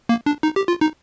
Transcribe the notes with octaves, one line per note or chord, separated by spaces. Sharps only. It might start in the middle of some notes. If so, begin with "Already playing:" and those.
A#3
D4
D#4
G4
F4
D#4